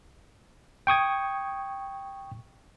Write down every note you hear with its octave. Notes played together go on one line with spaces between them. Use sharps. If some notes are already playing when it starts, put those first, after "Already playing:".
G5 C#6 D#6 G#6